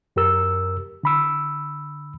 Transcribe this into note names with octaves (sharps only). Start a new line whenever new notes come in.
F#2 G4 A#4 E6
D3 B5 E6